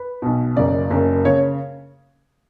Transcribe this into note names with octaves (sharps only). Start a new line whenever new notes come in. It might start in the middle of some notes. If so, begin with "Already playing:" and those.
Already playing: B4
B1 B2
F#1 F#2 C#3 D5
F#1 F#2 C#3
C#3 C#5